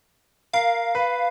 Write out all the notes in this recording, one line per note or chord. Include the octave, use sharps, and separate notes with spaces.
A#4 F5
B4